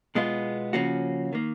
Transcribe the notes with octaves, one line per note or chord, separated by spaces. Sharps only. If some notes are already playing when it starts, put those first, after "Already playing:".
B2 G#3 B3 F4
C#3 F3 A#3 C#4 F#4
D#3 A#3